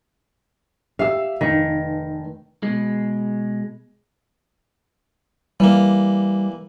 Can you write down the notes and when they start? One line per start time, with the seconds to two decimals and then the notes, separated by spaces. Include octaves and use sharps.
0.99 G4 E5 F5 E6
1.41 F1 D#3
2.63 B2 G#3
5.60 E3 G3 A#3